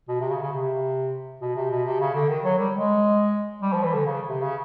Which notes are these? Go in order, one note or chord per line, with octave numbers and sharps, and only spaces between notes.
B2
C3
C#3
C#3
C3
B2
C3
B2
C3
C#3
D3
D#3
F#3
G3
G#3
G3
F3
E3
D3
C#3
C3
C#3